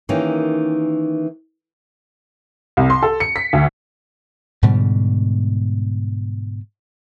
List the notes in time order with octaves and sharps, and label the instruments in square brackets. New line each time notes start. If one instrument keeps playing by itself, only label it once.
[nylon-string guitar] D#3 E3 A#3 C#4 D#4 G4
[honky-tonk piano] C2
C6
A4
C#7
B6
D2
[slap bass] G#2 B2 D3 G3